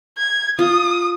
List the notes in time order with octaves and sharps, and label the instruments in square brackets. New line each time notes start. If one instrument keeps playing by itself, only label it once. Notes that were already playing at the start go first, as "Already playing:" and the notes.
[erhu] G#6
[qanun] F4 [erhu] D#6